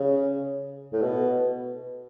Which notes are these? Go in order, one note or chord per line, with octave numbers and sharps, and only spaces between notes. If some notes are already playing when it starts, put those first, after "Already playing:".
Already playing: C#3
A2
B2